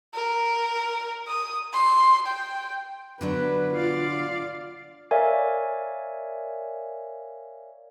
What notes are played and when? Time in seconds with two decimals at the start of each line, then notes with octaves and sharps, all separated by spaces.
0.14 A#4
1.27 D#6
1.73 C6
2.26 G5
3.21 D3 F#3 B3 D4 B4
3.75 F4 D5 F5
5.11 A#4 C#5 D5 E5 F5 G#5